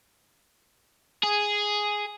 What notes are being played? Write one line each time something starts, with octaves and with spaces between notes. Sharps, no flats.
G#4